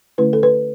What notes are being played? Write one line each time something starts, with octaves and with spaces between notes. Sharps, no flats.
D3 A3 C#4 E4 B4
A4
B4